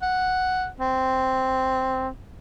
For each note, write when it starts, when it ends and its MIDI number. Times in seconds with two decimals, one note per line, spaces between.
0.02 0.67 78
0.80 2.09 60